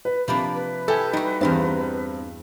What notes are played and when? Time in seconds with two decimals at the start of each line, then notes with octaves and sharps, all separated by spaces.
0.05 B4
0.28 C3 F3 A#3 D4 B5
0.55 B4
0.88 E4 G4 A4 G#5
1.13 G3 D#4 F#4
1.41 E2 G2 C4 A#4 A5